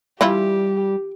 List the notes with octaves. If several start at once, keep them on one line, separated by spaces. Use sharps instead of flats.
E3 G3 E4 F4 G4